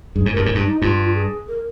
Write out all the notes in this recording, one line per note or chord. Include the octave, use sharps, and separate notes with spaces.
G2 G#4
G#2
G2 A#4
G#2
G2
D#4
G2 F4
G#4
A#4